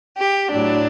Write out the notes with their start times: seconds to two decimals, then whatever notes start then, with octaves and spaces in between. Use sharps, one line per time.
0.18 G4
0.51 A2 F#3 D4